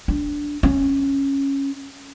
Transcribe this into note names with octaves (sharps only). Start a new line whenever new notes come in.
D4
C#4